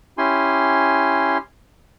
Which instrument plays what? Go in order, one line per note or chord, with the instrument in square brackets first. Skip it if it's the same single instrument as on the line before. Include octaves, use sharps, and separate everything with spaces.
[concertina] C#4 E4 G4 G#5 C6